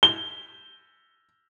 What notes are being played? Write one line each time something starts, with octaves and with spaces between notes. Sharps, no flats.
G7